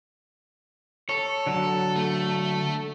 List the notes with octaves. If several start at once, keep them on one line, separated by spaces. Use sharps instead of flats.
A4 C#5
D3 F#3
A3